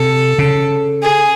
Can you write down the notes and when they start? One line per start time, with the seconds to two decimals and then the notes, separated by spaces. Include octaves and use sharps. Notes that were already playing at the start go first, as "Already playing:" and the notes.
Already playing: C3 A4
0.39 C#3
1.03 G#4